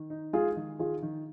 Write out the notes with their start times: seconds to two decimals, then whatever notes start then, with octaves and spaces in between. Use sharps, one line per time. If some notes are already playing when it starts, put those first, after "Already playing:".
Already playing: D#3
0.10 D#4
0.33 G#3 F4 G#4
0.56 D#3
0.79 D#3 F4 G#4
1.02 D#3